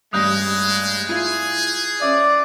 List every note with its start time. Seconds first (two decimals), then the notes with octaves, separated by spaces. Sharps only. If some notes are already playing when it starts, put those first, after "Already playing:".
0.13 A1 G2 G#3 D#6 F#6 G6 A#6
1.09 E4 F4 G#4
2.01 C#4 D5 E5